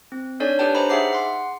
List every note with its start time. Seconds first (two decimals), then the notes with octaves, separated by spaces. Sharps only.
0.12 C4
0.40 D4 D#4 A4 C#5 D5 G#5
0.59 D4 G4 B4 C#5 G5 A5
0.75 C5 D#5 G5 G#5 A#5 B5
0.89 D#4 G#4 E5 F#5 D6 C7
1.13 F#5 C6